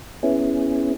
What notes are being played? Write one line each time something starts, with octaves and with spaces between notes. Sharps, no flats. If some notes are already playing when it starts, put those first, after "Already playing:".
B3 C#4 E4 G#4